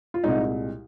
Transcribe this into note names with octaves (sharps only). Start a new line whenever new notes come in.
F4
C2 A#2 G#3 D#4